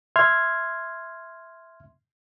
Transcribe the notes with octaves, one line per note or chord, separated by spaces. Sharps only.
E5 C6 F6 G#6